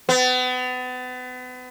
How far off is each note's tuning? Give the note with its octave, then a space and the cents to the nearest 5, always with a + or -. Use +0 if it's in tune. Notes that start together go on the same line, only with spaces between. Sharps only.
B3 +35